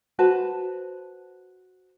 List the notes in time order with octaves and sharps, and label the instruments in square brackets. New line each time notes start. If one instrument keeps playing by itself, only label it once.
[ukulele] F#4 B4 C5 A5